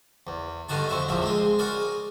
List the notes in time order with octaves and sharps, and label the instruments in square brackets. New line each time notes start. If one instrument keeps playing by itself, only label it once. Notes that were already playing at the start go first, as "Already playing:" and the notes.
[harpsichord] E2
G2 D3 D#3 F#4 A5
F2 C4 F#4 E5
A#1 E2 F3 E5
G#3 C4 G#4
F#4 G#4 A#4 D5